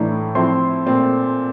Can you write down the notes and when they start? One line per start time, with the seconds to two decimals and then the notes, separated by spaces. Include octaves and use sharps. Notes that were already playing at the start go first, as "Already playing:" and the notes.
Already playing: A2 E3 A3 D4 A#5
0.35 F3 C4 E4 C6
0.86 A#2 A3 C4